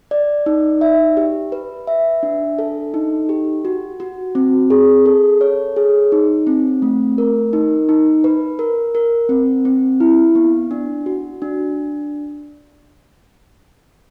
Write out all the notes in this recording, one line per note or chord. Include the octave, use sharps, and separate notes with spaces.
D5
D#4
E5
G4
B4
E5
D4
A4
D#4
G4
F#4
F#4
C4
G#4
A4
C#5
G#4
D#4
C4
A3
A#4
D#4
D#4
B4
A#4
A#4
C4
C4
E4
B3
D4
F#4
D4